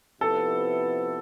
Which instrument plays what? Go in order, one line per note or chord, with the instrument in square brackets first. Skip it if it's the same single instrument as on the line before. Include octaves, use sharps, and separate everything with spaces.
[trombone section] C3 F3 B3 E4 B4 [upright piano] A4